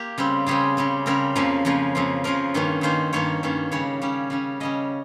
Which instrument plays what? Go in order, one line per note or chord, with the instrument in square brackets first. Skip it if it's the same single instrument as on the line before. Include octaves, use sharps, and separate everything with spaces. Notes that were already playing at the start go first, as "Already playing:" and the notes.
Already playing: [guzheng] A#3 F4 G4
C#3 G3 C4
C#3 G3 C4 G#4
C#3 G3 C4
C#3 G3 C4 A#4
F2 C#3 F3 A#3
F2 C#3 F3 A#3
F2 C#3 F3 A#3
F2 C#3 F3 A#3 A#4
G2 D#3 A#3 C#4
G2 D#3 A#3 C#4 C5
G2 D#3 A#3 C#4 C#5
G2 D#3 A#3 C#4
C#3 G3 C#4 C#5
C#3 G3 C#4
C#3 G3 C#4
C#3 G3 C#4 D#5